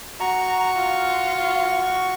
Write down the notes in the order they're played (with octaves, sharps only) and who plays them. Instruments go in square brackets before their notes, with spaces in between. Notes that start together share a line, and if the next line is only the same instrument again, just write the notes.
[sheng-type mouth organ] F#4 C#6 [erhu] A#5
[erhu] F4